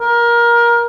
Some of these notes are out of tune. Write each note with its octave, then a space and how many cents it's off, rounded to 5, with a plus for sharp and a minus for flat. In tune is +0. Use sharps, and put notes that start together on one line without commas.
A#4 +20